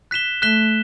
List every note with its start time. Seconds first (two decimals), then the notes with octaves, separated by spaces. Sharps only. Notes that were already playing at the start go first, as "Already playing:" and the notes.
0.11 F#6 B6 E7 G7
0.42 A3 F#6 B6 E7 G7